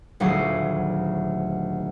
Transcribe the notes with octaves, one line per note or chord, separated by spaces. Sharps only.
D#1 D2 F#3 A3 G#4 C7